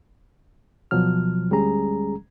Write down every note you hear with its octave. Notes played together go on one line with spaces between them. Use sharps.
D2 B2 F3 F#3 F6
D2 G3 G#3 C#4 G#4 A#5